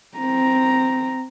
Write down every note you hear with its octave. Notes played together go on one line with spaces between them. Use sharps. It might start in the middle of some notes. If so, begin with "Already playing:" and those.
C4 A#5